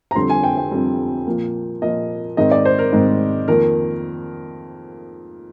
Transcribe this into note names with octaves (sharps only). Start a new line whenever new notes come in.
A#5
F2 D3 G3 C4 C6
G#5
G5
G5
F2 D3 G3 C4
A#2 F3 A#3
A#2 F3 A#3 D#5
G#2 D#3 G#3 C4 D#5
D5
C5
A#4
G#2 D#3 G#3 C4
F2 D#3 A#3 A#4